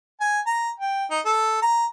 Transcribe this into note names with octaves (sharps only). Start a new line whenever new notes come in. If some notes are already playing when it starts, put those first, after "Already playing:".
G#5
A#5
G5
D#4
A4
A#5